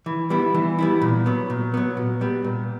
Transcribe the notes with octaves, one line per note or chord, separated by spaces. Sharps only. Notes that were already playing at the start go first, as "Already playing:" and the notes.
E3
G3 B3 E4
E3
G3 B3 E4
A#2
F#3 B3
A#2
F#3 B3
A#2
G3 B3
A#2